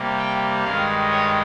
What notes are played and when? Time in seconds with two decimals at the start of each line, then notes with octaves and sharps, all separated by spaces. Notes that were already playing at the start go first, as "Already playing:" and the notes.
Already playing: C3 G3 A#3
0.18 G5
0.64 G2 D#3 G#3 F5
1.11 C#5